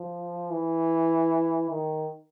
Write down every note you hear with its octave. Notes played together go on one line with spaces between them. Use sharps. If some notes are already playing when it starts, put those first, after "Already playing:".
Already playing: F3
E3
D#3